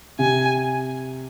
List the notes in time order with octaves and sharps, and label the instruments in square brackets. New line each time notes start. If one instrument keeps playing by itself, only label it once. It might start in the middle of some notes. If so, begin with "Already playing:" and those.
[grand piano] C3 [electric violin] G#5